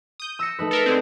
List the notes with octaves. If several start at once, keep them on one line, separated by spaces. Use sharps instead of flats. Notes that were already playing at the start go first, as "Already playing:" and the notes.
D#6 G6
E6 A#6 C#7
A3 D#4 B4
A4 A#4 E5
D3 G#3 C4